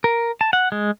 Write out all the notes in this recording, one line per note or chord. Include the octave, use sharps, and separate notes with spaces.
A#4
A5
F#5
G#3